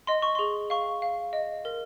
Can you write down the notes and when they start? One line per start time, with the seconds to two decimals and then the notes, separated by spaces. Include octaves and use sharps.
0.07 D#5 C6
0.22 C#6
0.35 G#4 C6
0.70 F5 C#6
1.02 F5
1.33 D#5
1.65 A#4